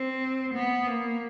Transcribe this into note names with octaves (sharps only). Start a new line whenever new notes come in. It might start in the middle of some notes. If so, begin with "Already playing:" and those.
Already playing: C4
B3
A#3